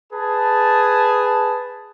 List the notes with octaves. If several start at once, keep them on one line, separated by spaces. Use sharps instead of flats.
G#4 B4 A5